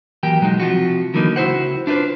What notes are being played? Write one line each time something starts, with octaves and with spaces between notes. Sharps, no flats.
E3 F#3 A#3 G4 G5
B1 F#3 G#3 D#4
C3 F3 F4 F#4
D3 E3 F#3 A#3 B3 D#4
C#2 E4 F#4 C5 F#5
D4 E4 F4 B4 C5